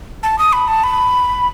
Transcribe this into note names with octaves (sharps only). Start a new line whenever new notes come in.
A5
D#6
B5
A5
B5